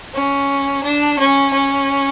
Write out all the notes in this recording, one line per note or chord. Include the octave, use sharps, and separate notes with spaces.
C#4
D4
C#4
C#4